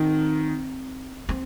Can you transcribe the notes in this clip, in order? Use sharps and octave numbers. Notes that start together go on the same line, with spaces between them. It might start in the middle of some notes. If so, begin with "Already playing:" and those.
Already playing: D#3 C4
C4